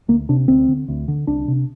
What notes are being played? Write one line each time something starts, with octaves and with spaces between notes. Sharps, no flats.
D2 A#3
C3 D4
D2 C4
D3
D2
D3
C2 D4
C3